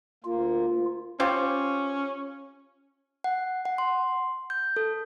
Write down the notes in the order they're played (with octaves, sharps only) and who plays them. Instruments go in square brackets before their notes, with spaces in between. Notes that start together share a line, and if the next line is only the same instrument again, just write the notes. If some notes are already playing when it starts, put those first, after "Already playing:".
[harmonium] D2 A#3 [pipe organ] F4
[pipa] C4 F4 G4 [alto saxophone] C#4
[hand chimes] F#5
F#5
C6
G6
A4